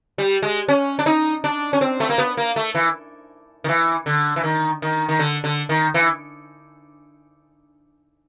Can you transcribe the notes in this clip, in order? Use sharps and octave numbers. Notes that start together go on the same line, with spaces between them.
G3
G#3
C#4
D4
D#4
D4
C#4
C4
A3
A#3
B3
A#3
A3
E3
D#3
E3
D3
E3
D#3
D#3
D#3
D3
D3
D#3
E3